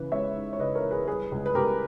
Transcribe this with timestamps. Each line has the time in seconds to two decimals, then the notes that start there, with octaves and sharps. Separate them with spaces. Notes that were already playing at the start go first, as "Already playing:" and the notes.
Already playing: C#3 E3 B4
0.12 G#3 C#5 E5
0.35 D#4
0.53 C#5
0.59 C#3 B4 D#5
0.75 A#4 C#5
0.83 E3
0.91 G#4 B4
1.08 G3 G#4 B4
1.32 C#2
1.46 B4
1.55 C#2 G4 A#4